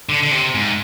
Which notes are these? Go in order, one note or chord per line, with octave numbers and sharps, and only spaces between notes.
D3
D3
C3
G#2